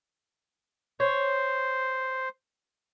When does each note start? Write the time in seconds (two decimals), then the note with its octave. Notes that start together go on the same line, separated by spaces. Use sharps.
1.00 C5 C#5